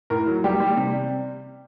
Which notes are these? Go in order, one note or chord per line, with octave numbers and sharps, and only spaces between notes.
A2 A#4
F#3
G3 G4
G3
C3